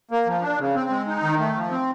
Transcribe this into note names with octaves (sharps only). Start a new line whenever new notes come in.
A#3
F3
D4
C#3
C4
G#3
D#4
D#3
A3
F3
C4